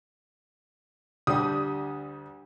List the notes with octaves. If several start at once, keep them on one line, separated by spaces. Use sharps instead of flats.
D2 G3 D4 G4 D#6